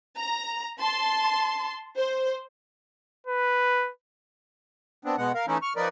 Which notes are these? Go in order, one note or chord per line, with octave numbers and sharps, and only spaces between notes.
A#5
A5 C6
C5
B4
B3 C4 D4
B2 G#3 B3 F#5
A#4 F5
E3 A3 C#4 D#4 E4
C#6 F6
F3 D#4 A#4 B4 D5